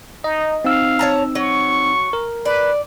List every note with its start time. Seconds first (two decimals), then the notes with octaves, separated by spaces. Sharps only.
0.24 D#4 D#5
0.64 C4 D#4 F5 E6
0.99 C#5 A5 A#5
1.35 F#3 C#6
2.13 A#4
2.45 B4 D5